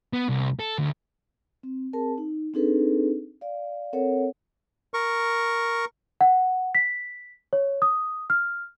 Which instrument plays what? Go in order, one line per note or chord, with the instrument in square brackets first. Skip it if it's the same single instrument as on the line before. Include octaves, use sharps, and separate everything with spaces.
[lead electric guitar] B3
C2
A4
D2
[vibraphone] C4
C4 G#4 A#4 A5
D#4
C4 D4 D#4 G#4 A4 B4
D5 F5
C4 A4 A#4 C#5 F#5
[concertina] A#4 C#6
[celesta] F#5
B6
C#5
D#6
F6